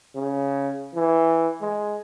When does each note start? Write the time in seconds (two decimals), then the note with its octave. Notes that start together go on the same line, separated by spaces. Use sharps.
0.15 C#3
0.95 E3
1.62 G#3